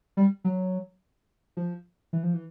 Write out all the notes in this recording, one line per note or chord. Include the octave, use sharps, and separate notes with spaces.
G3
F#3
F3
E3
F3
E3